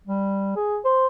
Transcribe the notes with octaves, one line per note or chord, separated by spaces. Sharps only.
G3
G#4
C5